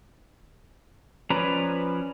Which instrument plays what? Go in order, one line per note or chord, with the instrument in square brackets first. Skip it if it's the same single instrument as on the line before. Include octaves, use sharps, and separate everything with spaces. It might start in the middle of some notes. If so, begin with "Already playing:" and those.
[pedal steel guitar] F3 C#4 B4 D5 A#5